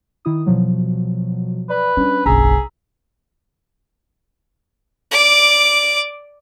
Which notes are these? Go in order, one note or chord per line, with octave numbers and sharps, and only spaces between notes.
D#3 E4 D#6
B2 F3 F#3
B4 D5 B5
G3 C#4 D4
F#1 B1 G#4 A#5 E6 B6
D5 D6